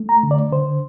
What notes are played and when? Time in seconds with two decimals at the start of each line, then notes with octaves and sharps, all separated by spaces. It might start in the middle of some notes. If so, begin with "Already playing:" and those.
Already playing: A3
0.09 A#5
0.23 D3
0.31 D5
0.52 D3 C5